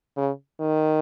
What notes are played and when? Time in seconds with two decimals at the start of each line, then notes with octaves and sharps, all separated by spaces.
0.17 C#3
0.60 D#3